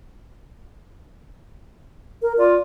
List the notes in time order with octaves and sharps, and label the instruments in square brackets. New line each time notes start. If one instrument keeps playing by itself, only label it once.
[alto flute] A#4
[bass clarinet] F4 [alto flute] D5